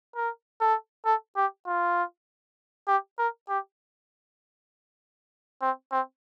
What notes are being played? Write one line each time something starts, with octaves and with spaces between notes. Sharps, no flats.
A#4
A4
A4
G4
F4
G4
A#4
G4
C4
C4